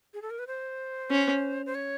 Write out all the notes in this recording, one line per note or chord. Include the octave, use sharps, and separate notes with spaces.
G#4
A4
A#4
B4
C5
C#4
C5
C#5